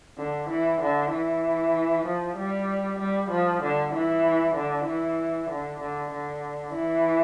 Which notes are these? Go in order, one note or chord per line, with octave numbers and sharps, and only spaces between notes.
D3
E3
D3
E3
F3
G3
G3
F3
D3
E3
D3
E3
D3
D3
D3
E3